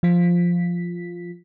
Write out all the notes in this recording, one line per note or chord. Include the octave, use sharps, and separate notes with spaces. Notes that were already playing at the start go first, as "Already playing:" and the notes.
F3 F4 B6